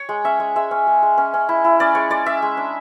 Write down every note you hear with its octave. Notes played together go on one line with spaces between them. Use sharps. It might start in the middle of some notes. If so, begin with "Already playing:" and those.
Already playing: C#5
G#3
C#4 E5
G#3
G#3 E5
C#4
G#3
G#3
C#4
C#4
E4
E4
C#4 D5
G#3 C#5
G#3 D5
C#4 E5
G#3
D4